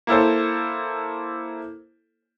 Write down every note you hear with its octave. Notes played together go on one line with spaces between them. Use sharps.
A#3 E4 A4 C5